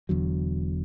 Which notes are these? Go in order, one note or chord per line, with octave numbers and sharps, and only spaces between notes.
E1 E2 D3 F#3